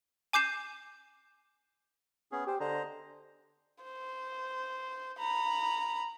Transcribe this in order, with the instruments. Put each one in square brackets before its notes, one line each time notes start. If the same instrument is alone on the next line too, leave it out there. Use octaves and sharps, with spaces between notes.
[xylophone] G#5 D6 G6 C7 E7
[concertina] B3 C#4 G#4
[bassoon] G4 [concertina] C5
[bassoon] D3 [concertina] C5 D#5 A#5
[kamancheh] C5
A#5 B5